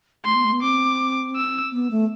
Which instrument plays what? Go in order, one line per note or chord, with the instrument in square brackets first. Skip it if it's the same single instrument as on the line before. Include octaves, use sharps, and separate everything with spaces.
[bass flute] A3 [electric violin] C6
[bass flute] B3
A3
B3
[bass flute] C4 [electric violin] D6
[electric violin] E6
[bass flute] B3
A3